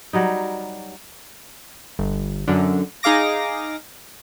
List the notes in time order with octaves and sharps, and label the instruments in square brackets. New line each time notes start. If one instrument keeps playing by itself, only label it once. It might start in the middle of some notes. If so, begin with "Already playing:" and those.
[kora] F#3 G3 D#4
[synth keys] G1
F#2 D3
D#4 G#4 F5 D6 A#6